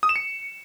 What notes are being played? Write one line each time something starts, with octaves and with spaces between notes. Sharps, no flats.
D#6
E7
C#7